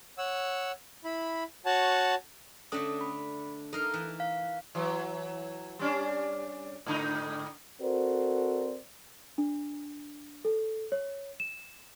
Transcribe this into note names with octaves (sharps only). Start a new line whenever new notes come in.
C#5 F#5 E6
E4 B5
F#4 C#5 F#5 A5
D3 A3 C#4 D4 A4 D#6
B5
D#4 A4 A#4 F5
E3
F5
E3 F#3
G3 C#4 D4
G#2 D3 D#4
C4 F#4 A4 A#4 C5 D5
D4
A4
C#5
E7